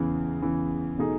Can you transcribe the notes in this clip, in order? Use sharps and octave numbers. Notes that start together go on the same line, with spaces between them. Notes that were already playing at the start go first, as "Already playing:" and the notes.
Already playing: E2 C#3 E3
E2 C#3 E3
B2 A3 D#4 G#4